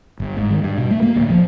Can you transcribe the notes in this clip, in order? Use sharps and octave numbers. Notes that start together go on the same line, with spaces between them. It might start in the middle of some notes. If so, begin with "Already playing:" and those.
G1
G#2
D#3
G2
B2
A3
A#3
D1
F3